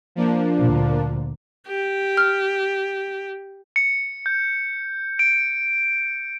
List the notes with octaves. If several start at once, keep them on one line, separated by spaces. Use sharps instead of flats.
F3 A#3 D4
D2 A#2
G4
F6
C#7
G6
D7